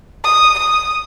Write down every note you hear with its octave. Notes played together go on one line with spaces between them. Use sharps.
D#6
D#6